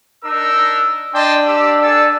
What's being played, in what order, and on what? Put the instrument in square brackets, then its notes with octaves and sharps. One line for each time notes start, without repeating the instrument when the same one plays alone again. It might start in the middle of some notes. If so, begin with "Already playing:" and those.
[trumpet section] D4 D#4 A#4 [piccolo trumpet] E6
[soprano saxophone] D4 [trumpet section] D#5 A5 C6 [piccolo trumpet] G5
[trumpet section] G4 [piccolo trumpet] E6
[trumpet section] G#4 A4 A5 [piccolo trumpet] E6